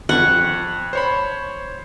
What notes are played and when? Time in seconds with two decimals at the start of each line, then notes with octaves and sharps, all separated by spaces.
0.09 F2 F#5 C#6
0.93 C5 C#5 B5